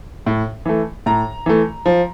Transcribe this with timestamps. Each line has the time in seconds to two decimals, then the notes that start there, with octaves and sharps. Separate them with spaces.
0.26 A2
0.66 E3 A3
1.06 A2 A#5
1.46 E3 A3
1.86 F3